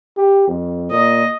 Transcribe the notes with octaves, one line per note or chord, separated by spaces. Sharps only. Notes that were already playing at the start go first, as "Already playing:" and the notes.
G4
F2
A#2 D#5